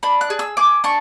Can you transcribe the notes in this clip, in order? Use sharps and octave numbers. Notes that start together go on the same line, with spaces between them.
D4 B5
F#6
G#4
E6
G#4 D6
D4 C#6